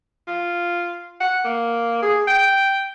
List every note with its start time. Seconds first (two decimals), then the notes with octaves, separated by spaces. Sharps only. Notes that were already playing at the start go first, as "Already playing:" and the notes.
0.27 F4
1.21 F#5
1.44 A#3
2.02 G#4
2.27 G5